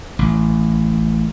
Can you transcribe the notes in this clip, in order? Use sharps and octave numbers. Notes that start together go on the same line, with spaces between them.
A1